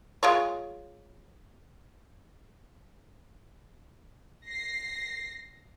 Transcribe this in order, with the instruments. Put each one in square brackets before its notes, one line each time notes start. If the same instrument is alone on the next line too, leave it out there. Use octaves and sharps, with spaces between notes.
[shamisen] G#3 F4 C#5
[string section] A#6 C7